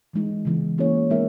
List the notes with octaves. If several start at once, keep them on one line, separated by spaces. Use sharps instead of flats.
E3 G#3 D#4
C#3 E3 B3
A#3 C#4 E4 G#4 C#5
G#3 B3 D#4 A#4 E5